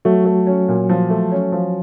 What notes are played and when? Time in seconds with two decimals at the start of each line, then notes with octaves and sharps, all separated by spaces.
0.05 F#3 A3 F#4
0.25 A3
0.47 C#4
0.68 A#2
0.89 F3
1.10 A3
1.32 C#4
1.52 F3